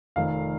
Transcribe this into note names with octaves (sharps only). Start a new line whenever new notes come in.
F1 F2 D#3 F5